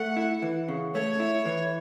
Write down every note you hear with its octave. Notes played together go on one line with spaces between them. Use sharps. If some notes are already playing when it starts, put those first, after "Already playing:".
Already playing: A3 F#5
E4
E3
C#3
A3 C#5
E4
E3